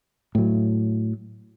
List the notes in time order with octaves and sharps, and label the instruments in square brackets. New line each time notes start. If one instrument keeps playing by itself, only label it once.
[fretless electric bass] A2 F#3